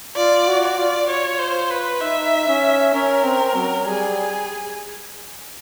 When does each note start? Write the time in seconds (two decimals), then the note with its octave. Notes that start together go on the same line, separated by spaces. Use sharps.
0.16 F4 D5
0.48 F#4
0.63 D5
0.78 F4
1.10 C#5
1.39 C5
1.70 B4
2.01 D#4 E5
2.48 C#4
2.94 C#4 A#4
3.24 C4
3.55 F#3
3.85 G3 G#4